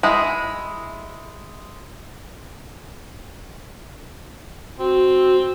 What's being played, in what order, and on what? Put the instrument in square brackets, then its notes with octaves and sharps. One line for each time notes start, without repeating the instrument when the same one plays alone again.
[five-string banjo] G#3 E4
[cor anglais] C4 [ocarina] F#4